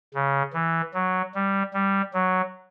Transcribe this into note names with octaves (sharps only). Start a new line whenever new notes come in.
C#3
E3
F#3
G3
G3
F#3